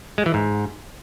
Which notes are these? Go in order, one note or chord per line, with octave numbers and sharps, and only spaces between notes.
G#3
E3
G#2